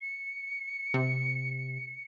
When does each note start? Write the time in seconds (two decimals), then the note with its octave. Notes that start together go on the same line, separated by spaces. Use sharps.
0.01 C#7
0.94 C3